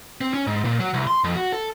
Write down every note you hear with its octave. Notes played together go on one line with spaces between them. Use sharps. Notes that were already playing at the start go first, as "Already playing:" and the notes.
C4
C#4
G#2
A#2
F#3
C2
C6
F2
F#4
A4